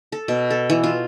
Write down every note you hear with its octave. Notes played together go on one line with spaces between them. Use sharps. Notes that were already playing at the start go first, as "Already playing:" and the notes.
A4
B2
A4
E3
F4